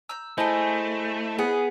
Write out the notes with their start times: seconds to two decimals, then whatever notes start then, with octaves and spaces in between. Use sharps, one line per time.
0.09 A#5 E6 G6
0.38 A3 E4 G#4 C5 D#5 G#5 A5
1.38 B3 G#4